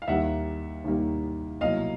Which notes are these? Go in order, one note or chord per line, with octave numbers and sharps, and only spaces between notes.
F5
D#2 D#3 G3 A#3 E5 F#5
D#2 D#3 G3 A#3
C2 B2 F#3 A#3 D#5 F5